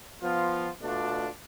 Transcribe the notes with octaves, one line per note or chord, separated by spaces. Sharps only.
F3 B3 F4
B2 A3 D4 F4